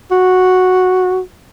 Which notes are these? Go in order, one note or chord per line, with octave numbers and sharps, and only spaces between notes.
F#4